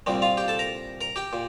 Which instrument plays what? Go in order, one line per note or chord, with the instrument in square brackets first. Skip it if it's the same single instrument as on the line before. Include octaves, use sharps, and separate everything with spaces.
[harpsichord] C2 A#2 G3 C4
F4 F5
G4 G5
A4 A5
A#4 A#5
A#4 A#5
G4 G5
A#2